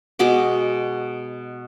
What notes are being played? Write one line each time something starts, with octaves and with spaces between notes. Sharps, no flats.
B2 G#3 F#4 D6